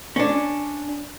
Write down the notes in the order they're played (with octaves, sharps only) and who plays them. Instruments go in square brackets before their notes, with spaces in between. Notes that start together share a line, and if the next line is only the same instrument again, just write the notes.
[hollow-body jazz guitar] C#4 D4